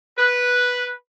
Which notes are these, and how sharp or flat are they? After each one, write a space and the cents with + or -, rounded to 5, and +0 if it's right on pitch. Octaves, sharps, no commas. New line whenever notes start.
B4 -5